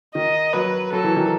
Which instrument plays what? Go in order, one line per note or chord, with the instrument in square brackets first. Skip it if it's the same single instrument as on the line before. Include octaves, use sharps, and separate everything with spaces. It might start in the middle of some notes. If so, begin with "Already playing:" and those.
[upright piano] D#3 [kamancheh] D#5
[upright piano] F#3 [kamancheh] B4
[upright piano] F#3 [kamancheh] A4
[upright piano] E3
D#3